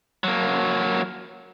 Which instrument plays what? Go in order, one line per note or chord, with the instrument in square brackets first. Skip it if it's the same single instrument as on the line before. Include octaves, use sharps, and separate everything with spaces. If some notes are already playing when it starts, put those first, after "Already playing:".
[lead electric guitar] F#3 A#3